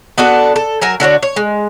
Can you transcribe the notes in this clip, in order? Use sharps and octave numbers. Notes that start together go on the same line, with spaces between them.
B3 D4 F#4 A4
A4
F#3 A#4 G#5
D3 D4 F#4 C#5
C#5
G#3